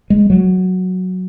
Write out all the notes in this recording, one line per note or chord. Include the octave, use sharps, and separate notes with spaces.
G#3
F#3